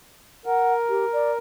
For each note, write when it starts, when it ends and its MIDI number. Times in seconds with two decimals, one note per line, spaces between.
0.46 1.38 70
0.46 0.73 78
0.89 1.05 67
1.13 1.31 74